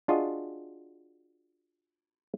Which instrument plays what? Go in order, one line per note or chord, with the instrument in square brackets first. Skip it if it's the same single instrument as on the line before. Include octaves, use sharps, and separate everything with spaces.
[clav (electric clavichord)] D4 F4 F#4 G#4 D#5